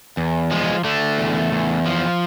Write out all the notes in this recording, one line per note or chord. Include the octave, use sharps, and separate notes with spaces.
E2
F3 G#3
D3 A3
E2
E2
F3